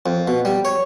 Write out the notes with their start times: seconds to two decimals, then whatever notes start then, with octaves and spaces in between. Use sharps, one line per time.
0.06 F2
0.28 B2
0.45 G3
0.65 C#5